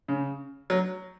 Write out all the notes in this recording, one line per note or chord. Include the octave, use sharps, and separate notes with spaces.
C#3
F#3